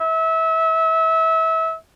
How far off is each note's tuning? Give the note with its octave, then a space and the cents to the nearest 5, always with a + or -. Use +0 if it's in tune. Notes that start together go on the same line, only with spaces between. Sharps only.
E5 -25